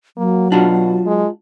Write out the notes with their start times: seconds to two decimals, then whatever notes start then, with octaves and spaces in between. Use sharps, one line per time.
0.17 F#3 A#3
0.52 B2 D4 F4 F#4
1.06 G#3